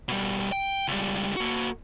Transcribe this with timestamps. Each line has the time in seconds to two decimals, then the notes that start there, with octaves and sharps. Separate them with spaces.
0.08 B2 G3
0.52 G5
0.88 C#2 G3
1.37 A#3 F#4